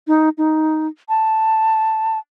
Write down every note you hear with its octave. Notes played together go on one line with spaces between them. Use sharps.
D#4
D#4
A5